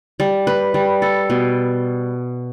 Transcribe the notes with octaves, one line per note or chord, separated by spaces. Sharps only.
G3
B4
G3
A4
B2